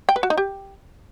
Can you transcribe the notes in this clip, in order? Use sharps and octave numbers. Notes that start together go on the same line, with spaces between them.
G5
B4
F#4
D#4
G4